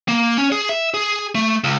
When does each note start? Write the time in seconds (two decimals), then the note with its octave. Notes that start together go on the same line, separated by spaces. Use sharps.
0.08 A#3
0.38 C#4
0.52 G#4
0.69 E5
0.94 G#4
1.35 A3
1.64 C#2